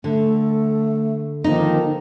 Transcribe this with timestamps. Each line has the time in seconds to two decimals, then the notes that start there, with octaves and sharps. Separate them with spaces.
0.04 D3 A3
1.44 D#3 F3 A#3 D#4